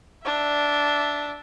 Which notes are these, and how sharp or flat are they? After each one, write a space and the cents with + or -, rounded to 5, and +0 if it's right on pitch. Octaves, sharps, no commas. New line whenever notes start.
D4 -5 E5 +0